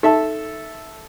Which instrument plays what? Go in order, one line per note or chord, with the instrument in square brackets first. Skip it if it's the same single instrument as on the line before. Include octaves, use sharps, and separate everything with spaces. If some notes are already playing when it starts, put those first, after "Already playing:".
[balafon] D#4 A5 [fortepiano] A4 E5